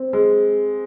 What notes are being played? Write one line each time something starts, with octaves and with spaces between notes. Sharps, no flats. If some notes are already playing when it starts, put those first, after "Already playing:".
Already playing: C4
G#3